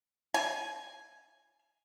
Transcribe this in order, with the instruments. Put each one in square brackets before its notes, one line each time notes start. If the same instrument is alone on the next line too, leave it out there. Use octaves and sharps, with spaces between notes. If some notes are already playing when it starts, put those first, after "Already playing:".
[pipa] G#5